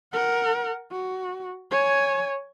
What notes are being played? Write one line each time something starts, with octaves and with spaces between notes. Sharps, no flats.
A#4 F#5
F#4
C#5 G#5